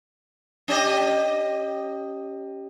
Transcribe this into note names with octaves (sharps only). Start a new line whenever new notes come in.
C#4 G4 D#5